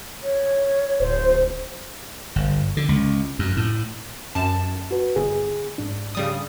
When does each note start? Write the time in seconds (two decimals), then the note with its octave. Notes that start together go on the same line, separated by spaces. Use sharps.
0.23 C#5
1.00 D1 C5
2.36 G1
2.77 D3
2.89 C#2
3.39 F#2
3.57 A2
4.35 F#2 A5
4.91 F#4 B4
5.16 G1 G#4
5.78 G#2 D4
6.15 C#3 G3 D#6